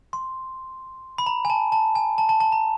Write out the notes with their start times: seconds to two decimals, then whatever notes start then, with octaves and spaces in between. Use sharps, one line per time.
0.13 C6
1.18 B5
1.26 A#5
1.45 G#5
1.50 A5
1.72 A5
1.95 G#5
2.18 A5
2.29 A5
2.41 A5
2.52 A#5